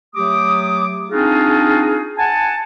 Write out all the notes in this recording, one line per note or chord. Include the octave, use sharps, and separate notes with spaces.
F#3 A3 G4 D6 D#6
C4 D4 D#4 F4 F#4 G#4
F#5 G#5 A5